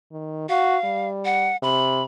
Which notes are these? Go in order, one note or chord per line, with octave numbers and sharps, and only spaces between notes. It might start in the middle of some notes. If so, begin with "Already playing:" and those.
D#3
F#4 F5
G3
F#5
C3 B5